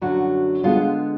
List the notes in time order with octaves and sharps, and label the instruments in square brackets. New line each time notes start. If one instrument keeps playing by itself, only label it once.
[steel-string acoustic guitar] F#2 D3 F#3 F#4
D3 G#3 B3 F4